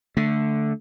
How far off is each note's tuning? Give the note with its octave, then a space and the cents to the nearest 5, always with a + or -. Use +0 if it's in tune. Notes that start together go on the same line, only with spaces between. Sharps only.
D3 -5 A3 +0